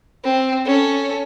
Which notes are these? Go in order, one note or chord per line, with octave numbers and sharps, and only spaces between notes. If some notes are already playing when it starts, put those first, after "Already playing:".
C4
C#4 A4